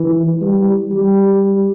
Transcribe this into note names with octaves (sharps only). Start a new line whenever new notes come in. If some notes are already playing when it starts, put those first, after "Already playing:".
Already playing: E3
G3
G3